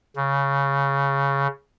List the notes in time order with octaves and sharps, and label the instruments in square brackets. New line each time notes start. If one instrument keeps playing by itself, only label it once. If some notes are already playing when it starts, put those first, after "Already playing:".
[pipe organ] C#3